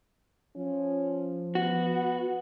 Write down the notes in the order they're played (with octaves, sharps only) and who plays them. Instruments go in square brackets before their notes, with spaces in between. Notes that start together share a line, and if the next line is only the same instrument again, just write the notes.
[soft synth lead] F3 [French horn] C#4
[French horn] B3 [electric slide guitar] F#4